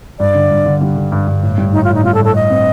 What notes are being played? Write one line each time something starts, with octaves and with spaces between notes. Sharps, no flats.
G2 D5
D3
G2
D3
G3
D3
G2
G2
A2
G3
A2 D#4
F4
A2
D#4
G3 F4
A4
A2
A4
A2 D#5
C4